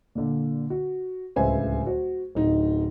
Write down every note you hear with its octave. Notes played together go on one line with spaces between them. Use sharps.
A#2 D3
F#4
D1 C#2 B4 C5 E5 G#5
F#4 C5
D1 D#4